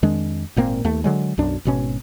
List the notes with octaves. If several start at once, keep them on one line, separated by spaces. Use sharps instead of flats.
F2 D#3 G#3 D4
G#1 A#2 A#3 C4
D#2 A3
D3 F#3 G#3
B1 F#2 D4
G#1 B2 C#4